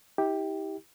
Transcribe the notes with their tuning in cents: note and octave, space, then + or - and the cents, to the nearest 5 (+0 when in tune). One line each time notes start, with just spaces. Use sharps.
E4 -45 G4 +5